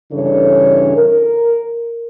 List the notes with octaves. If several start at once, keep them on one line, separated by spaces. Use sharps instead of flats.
G2 C#3 E3 D4 A4 C#5
A#4